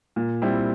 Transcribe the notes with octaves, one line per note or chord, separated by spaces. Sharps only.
A#2
G3 C4 E4